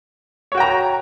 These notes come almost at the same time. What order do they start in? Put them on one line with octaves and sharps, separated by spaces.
C#5 F#4 G5 A#5